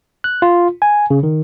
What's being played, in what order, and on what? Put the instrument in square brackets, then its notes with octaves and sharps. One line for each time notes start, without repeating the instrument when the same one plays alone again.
[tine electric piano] F#6
F4
G#5
C#3
D#3